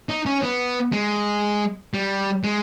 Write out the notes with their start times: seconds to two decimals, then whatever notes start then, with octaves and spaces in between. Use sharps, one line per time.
0.09 D#4
0.26 C#4
0.43 B3
0.93 G#3
1.94 G3
2.44 G#3